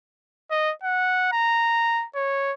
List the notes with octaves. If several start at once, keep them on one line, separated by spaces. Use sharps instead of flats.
D#5
F#5
A#5
C#5